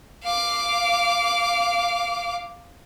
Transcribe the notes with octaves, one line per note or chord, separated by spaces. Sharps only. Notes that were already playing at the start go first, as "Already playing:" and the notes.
F5 D6